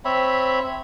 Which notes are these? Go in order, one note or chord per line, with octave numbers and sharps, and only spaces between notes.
C4 C#5 E5 B5